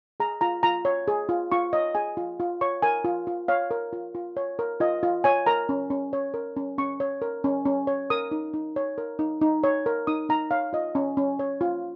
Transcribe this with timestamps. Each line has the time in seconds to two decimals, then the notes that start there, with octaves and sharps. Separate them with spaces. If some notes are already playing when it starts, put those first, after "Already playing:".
0.20 G#4 A#5
0.41 F4 A#5
0.63 F4 A#5
0.85 C#5
1.08 G#4
1.29 F4
1.52 F4 C#6
1.73 C#5 D#5
1.95 G#4 G#5
2.17 F4
2.40 F4
2.61 C#5 C#6
2.82 A#4 G#5
3.04 F4
3.27 F4
3.48 C#5 F5
3.71 A#4
3.93 F4
4.15 F4
4.37 C#5
4.59 A#4
4.80 F4 D#5
5.03 F4
5.24 C#5 G#5
5.46 A#4 A#5
5.69 C#4
5.90 C#4
6.13 C#5
6.34 A#4
6.56 C#4
6.78 C#4 C#6
7.00 C#5
7.22 A#4
7.44 C#4
7.65 C#4
7.87 C#5
8.10 A#4 D#6
8.31 D#4
8.54 D#4
8.76 C#5
8.98 A#4
9.19 D#4
9.41 D#4
9.64 C#5
9.86 A#4
10.07 D#4 D#6
10.29 D#4 A#5
10.51 C#5 F5
10.73 F4 D#5
10.95 C#4
11.17 C#4
11.39 C#5
11.61 F4